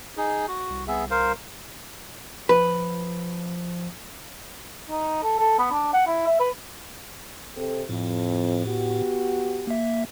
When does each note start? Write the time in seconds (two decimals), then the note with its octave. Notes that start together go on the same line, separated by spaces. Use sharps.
0.17 D#4 G#4
0.48 F#4
0.70 C2
0.87 B3 G#4 E5
1.11 A#4 C5 F5
2.49 F3 B4
4.90 D#4
5.23 A4
5.39 A4
5.59 B3
5.72 D4
5.94 F#5
6.07 E4
6.27 E5
6.40 B4
7.57 C3 C4 A4
7.89 F2 A2
8.66 B3 F#4 G4
9.67 A#3 E5